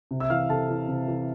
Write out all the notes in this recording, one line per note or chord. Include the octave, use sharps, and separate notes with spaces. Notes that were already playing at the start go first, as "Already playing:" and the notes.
C3
E5 E6
E3 F5 F6
C3 A4 A5
E3
C3
E3